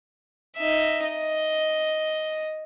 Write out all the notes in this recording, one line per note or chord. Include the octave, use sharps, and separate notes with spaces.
D#4 E5
D#5